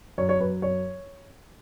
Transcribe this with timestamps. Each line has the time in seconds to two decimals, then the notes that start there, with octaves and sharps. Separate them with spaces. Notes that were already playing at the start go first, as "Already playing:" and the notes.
0.18 F#2 C#5
0.29 C#5
0.40 F#2 B4
0.62 F#2 C#5